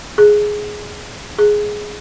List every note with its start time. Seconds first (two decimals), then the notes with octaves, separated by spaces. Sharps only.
0.18 G#4
1.39 G#4